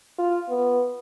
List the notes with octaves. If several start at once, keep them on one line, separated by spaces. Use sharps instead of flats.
F4
B3